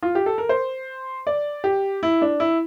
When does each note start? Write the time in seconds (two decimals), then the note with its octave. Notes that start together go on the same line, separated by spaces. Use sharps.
0.03 F4
0.15 G4
0.26 A4
0.38 A#4
0.49 C5
1.27 D5
1.64 G4
2.03 E4
2.22 D4
2.40 E4